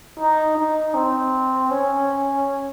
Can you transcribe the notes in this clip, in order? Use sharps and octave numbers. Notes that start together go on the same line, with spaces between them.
D#4
D#4
C4
C#4